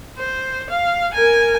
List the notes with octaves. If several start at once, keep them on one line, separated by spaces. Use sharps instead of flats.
C5
F5
A#4 G#5